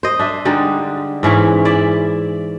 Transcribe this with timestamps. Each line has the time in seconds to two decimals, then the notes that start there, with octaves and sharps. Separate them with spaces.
0.03 C5 D#5
0.19 D4 E5
0.45 D3 G3 G#3 D#4
1.23 G#2 E3 C#4 E4
1.65 E4 D5 E5